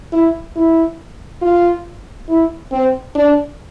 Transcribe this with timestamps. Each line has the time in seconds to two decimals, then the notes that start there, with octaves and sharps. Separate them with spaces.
0.12 E4
0.56 E4
1.42 F4
2.29 E4
2.72 C4
3.15 D4